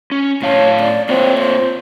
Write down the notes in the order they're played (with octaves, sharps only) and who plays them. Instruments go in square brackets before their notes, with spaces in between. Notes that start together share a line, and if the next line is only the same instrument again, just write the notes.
[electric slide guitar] C#4
[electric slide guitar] A2 F5 A5 [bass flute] C#5
[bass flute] D5
[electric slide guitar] A#3 F4 C#5 [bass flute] C4
[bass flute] C5